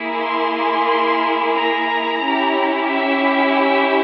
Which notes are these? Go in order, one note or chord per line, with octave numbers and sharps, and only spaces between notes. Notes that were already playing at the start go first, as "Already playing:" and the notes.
Already playing: A#3 E4 G#4
C6
A#5
C#4 E4 G4
E5
E5